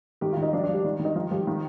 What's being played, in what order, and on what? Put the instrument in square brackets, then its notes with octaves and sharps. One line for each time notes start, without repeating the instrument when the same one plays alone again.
[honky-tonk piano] D#3 G4
F4
D#3
D#4
F3 D4
D4
F3
G3
D#3
D#3
D#4
F3 F4
F3 G4
D#3